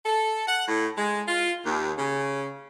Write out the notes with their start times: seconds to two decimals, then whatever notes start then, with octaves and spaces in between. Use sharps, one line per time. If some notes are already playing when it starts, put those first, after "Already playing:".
0.05 A4
0.47 F#5
0.67 A2
0.97 G#3
1.27 F4
1.65 D#2
1.98 C#3